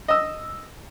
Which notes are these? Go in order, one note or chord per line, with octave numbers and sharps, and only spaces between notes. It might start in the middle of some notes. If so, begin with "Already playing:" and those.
D#5 E6